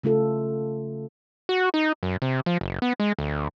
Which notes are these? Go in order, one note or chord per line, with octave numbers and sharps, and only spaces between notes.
C#3 A3 F4 A4
F#4
D#4
F#2
C3
F3
F#1
B3
G#3
D2